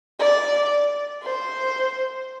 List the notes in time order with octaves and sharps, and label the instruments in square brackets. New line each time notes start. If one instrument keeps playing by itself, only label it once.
[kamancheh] D5
C5